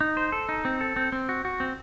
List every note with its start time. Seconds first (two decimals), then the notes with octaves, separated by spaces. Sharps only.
0.01 D#4
0.17 C5
0.32 A4
0.49 D#4
0.65 C4
0.81 A4
0.96 C4
1.12 C4
1.29 F#4
1.45 F#4
1.60 C4